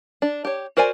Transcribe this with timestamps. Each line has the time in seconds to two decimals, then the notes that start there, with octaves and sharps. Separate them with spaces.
0.22 D4
0.45 G4 C#5
0.77 F#4 A#4 C5 D5 G#5